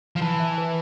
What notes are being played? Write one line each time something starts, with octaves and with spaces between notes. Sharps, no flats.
F3
E3 A5
E5
B4